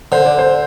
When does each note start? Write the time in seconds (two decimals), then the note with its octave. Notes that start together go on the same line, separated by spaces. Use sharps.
0.12 D3 C5
0.25 D5
0.39 C5